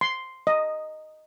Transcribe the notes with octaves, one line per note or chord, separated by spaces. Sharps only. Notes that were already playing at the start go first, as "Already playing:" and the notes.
C6
D#5